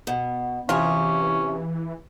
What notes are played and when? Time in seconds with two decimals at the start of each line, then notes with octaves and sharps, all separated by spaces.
0.07 B2
0.69 C3 E3 C#4 F4 G4 G#4